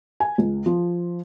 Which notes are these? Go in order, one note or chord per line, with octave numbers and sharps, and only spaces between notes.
G#5
C#2
F3